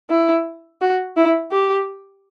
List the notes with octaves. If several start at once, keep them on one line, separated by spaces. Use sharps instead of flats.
E4
F#4
E4
G4